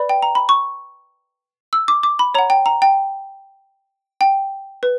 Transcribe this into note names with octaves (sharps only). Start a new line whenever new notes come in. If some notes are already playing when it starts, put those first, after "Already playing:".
Already playing: B4 D5 B5
G5
A#5
B5
C#6
E6
D6
D6
B5
C#5 F#5 A#5
G5
A#5
G5
G5
B4